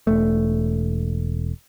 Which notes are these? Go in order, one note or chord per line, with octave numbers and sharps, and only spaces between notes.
E1 A3